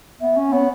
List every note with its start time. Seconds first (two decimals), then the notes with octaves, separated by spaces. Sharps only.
0.21 B3 E5
0.37 C#4
0.52 B3 C#5